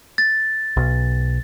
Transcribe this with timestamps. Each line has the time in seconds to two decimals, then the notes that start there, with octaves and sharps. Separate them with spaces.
0.18 A6
0.77 B1